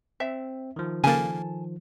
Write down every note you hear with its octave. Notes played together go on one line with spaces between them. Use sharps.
C4 E5
D#3 F3
C#3 A#3 A4 G#5